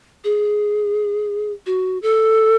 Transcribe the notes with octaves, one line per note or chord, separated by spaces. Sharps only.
G#4
F#4
A4